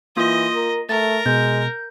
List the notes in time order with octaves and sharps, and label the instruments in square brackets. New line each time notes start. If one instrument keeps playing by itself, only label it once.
[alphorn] E3 [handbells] A#3 F4 D#6 [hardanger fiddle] D#5
[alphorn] A#4
[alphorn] A3 [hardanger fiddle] A#4 [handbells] A6
[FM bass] B2 [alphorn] G#3 [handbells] G6